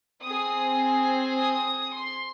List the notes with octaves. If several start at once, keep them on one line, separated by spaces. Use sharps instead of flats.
C4 G#4 D#6
D#6
C6